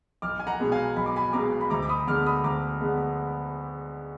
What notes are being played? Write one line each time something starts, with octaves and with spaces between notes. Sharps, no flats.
B1 D6 F6
G#5
F#5 A#5
B2 G#3
F5 G#5
B1 B5
D6
G#5 B5
B2 G#3 A#5 D6
B5
D2 A#5 D6
D6
B5 D#6
D3 G#3 B3 D6 F6
B5 D#6
D2 A#5 D6
D3 G#3 B3